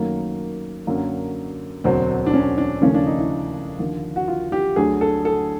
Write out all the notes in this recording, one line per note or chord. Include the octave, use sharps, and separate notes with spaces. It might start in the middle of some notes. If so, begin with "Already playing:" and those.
Already playing: F#2 D#3 F#3 A3 A#3
F#2 D3 F#3 A#3
E1 D2 D3 F#3 C4
D4
C#4
D4
D#2 C#3 F3 A3 C#4
D4
D#4
E4
D#2 D3 F3
F#4
F4
G4
D2 D3 F#3 A3 G#4
A4
A4